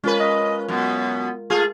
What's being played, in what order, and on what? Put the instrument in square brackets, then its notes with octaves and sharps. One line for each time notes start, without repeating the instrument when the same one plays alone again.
[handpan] G#3 F4 A#4 [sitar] C#4 B4
[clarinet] D#5
[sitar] F#2 B2 [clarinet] B3
[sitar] A3 F4 G#4